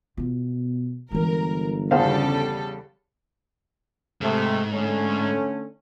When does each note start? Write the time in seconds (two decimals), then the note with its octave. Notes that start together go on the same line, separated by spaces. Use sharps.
0.17 B2 B3 F4
1.11 G1 E3 G#3 A#4
1.91 E2 C#3 G3 A4 C5 F5
4.21 G#2 C3 A3
4.72 D3 A3 C#4